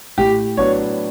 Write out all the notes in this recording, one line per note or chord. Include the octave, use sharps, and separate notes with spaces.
A2 G4
F#3 B3 D4 C#5